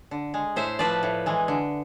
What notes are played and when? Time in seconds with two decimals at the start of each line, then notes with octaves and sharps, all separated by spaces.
0.11 D3
0.34 G#3
0.56 A2 C5 E5
0.79 F3 A3 B4 D5
1.03 A2
1.26 E3 G#3
1.48 D3